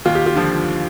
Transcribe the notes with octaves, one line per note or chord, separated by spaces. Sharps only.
D#2 F4
G4
F4
D3 F3